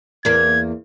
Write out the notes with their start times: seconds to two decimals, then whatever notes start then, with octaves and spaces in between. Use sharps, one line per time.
0.25 E2 A#3 G#6